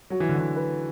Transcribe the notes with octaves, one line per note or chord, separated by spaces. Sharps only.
F#3 F#4
E3
D3
E3 F#4
B4